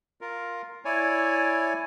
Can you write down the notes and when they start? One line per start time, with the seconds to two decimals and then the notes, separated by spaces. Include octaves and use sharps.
0.21 F4 A#4
0.85 E4 C#5 D5 G#5